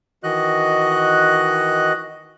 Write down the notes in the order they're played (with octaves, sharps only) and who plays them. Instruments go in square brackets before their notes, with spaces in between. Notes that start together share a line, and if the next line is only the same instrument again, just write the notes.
[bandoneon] D#3 E3 F#4 D#5 F#6